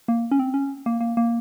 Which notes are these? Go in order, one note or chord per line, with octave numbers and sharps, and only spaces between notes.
A#3
C#4
C4
C#4
A#3
A#3
A#3